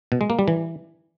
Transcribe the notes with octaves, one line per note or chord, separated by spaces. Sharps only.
B2
G#3
A#3
G3
E3